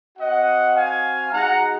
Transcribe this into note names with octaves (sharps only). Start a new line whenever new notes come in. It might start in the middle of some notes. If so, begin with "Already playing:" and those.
C4 F#4 D#5 F#5
F5 G#5
G#3 D#4 F#4 F#5 A#5